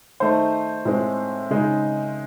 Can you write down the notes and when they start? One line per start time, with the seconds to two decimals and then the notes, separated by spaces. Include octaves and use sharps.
0.20 D#3 A3 D#4 C5
0.85 A2 G#3 C4
1.50 C#3 G#3 D#4